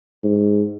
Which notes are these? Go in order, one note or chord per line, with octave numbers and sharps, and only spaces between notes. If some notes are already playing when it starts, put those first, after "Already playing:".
G#2